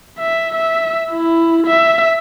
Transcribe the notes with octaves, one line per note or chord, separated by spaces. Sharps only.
E5
E5
E4
E5